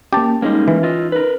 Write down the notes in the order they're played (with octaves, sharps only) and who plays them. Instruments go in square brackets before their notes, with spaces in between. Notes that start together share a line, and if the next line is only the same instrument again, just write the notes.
[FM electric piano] A#3 C#4 [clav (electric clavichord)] G4 A5
[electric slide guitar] G3 G#3 A#3 [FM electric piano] C#4 D#4
[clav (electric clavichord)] E3
[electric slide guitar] F4 D#5
A#4 B4